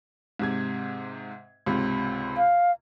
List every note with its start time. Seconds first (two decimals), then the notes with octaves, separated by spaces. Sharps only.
0.39 G#2 C3 G#6
1.66 C#2 G#2 C3
2.37 F5